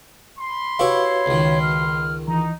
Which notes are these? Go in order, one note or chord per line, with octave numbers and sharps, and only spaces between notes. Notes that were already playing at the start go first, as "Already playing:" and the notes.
B5 C6
E4 F#4 G4 B4 C#5 F5 C#6
C#2 D#3
F6
E3 D#4 A#5